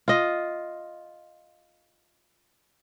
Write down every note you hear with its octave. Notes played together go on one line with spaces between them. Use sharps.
F4 D#5